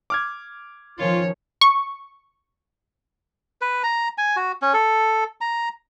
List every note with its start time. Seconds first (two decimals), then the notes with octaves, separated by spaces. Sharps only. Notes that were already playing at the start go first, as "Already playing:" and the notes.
0.10 D6 F6 G#6
0.98 D#3 F3 C#4 F4 C#5
1.61 C#6
3.61 B4
3.83 A#5
4.18 G#5
4.36 F#4
4.62 C#4
4.73 A4
5.41 A#5